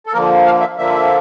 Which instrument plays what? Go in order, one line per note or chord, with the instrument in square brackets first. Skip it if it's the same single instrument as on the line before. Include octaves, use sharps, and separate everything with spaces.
[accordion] A4
D3 F3 A#3 A#4
F5
E5
D3 F3 A#3 E5